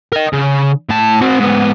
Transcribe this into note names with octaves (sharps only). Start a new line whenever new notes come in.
A#4 D#5
C#3
A2 A5
C4 F#4
G#2 B3